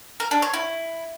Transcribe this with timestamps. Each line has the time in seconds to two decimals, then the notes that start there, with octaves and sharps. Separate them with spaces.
0.20 A#4
0.31 D4
0.42 C#5
0.54 E4